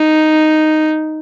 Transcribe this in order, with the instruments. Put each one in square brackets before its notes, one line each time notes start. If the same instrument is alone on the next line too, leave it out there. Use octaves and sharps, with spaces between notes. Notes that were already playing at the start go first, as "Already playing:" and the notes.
Already playing: [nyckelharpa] D#4